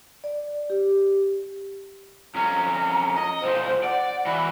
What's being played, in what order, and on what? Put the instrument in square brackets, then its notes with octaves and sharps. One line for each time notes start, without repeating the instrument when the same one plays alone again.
[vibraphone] D5
G4
[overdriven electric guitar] F2 C#4 [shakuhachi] A#5
[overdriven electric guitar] D#5
[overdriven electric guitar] B1 F3 [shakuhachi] C5
[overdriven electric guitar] D5 [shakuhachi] F#5
[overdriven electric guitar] E3 F#4 [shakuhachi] B5